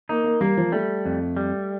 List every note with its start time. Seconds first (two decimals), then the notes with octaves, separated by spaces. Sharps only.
0.09 A#3 D#4
0.24 A#3
0.41 G3 A#3
0.57 F3
0.72 G3 A3
1.05 F2
1.37 G3